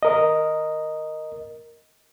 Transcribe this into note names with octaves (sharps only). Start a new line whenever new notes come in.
A#4 D#5